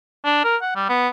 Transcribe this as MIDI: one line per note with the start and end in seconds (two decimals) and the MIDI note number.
0.25 0.43 62
0.44 0.56 70
0.62 0.71 78
0.76 0.87 55
0.89 1.08 59